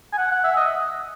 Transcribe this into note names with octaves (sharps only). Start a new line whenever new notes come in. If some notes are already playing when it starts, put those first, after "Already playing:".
G#5
F#5
F#5
E5
D#5